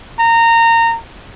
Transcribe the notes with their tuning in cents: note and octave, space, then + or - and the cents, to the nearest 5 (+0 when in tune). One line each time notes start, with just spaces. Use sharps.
A#5 -20